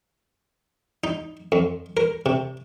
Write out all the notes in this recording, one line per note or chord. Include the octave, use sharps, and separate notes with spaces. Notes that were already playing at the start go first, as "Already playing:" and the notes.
D#4
F2
A#4
C3